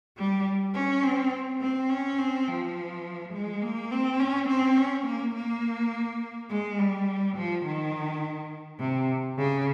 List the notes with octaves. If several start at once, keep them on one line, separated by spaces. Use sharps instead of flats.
G3
C#4
C4
C4
C#4
C4
F3
G#3
A#3
C4
C#4
C4
C#4
A#3
A#3
G#3
G3
F3
D#3
C3
C#3